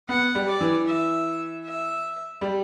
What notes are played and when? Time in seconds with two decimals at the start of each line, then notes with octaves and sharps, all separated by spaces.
0.09 B3 F#5
0.35 G3
0.48 D5
0.61 E3
0.86 E5
1.65 E5
2.41 G3